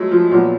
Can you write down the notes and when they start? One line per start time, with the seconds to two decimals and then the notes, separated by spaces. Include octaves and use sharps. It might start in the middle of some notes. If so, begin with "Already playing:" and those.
Already playing: F#3 G#3 A3
0.11 F3
0.31 A#2 F3 F#3 B3